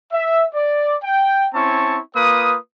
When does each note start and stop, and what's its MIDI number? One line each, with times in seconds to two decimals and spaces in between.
0.13 0.45 76
0.55 0.95 74
1.04 1.47 79
1.54 1.98 60
1.54 1.98 61
1.54 1.98 64
1.54 1.98 81
1.54 1.98 85
2.16 2.57 58
2.16 2.57 65
2.16 2.57 71
2.16 2.57 87